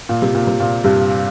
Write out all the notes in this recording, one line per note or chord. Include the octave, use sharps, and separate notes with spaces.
A#2
C3
A#2
C3
A#2
G2 C3